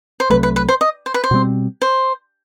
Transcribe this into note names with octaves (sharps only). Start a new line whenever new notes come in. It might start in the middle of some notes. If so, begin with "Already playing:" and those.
C5
C2 C3 F#3 A3 B4
B4
B4
C5
D#5
C5
B4
C5
B2 G3 C4
C5